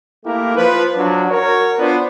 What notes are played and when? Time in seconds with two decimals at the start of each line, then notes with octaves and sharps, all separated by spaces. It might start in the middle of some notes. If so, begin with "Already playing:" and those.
0.25 A3 A#3 E4 G4 A#4
0.55 F3 B4
0.94 F3 F#3 D4
1.29 F#4 A#4 C#5
1.78 B3 D4 F4 B4 C5